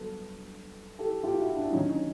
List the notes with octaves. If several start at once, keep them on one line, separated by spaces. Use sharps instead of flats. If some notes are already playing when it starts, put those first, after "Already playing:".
Already playing: G2 D3 F#3 B3 A4 B4
G4 A4
F4 G4
E4 F#4
D4 E4
D#2 D3 F#3 C#4 D#4
C#4 D#4